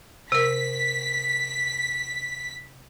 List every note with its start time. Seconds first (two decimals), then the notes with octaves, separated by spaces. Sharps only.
0.32 C3 A#4 B6